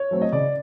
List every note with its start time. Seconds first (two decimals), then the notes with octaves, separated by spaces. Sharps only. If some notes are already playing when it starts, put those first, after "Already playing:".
Already playing: C#5
0.11 F#3 A3 C4
0.21 D#5
0.32 C#3 D5